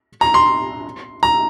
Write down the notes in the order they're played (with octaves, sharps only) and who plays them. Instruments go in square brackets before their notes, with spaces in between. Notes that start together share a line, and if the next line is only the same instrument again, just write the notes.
[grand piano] A#5
C6
A#5